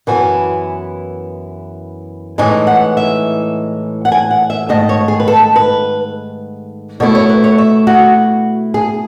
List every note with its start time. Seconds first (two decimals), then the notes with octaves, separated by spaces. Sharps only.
0.07 F#2 E3 B3 E4 G#5
2.38 A2 E3 G#3 D#4 G#5
2.67 F#5
2.97 E5
4.05 F#5
4.12 G#5
4.30 F#5
4.50 E5
4.69 G#2 D#3 A3 D#5
4.89 C#5
5.08 G#4
5.20 B4
5.28 A4
5.56 B4
7.00 B2 A3 E4 C#5
7.15 C#5
7.29 B4
7.44 C#5
7.58 E5
7.87 F#4
8.74 G#4